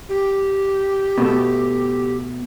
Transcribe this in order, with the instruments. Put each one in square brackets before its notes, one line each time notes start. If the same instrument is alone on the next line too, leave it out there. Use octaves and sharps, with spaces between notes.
[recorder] G4
[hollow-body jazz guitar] B2 A3